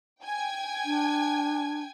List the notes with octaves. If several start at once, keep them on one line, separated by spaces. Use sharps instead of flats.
G5 G#5 G#6
D4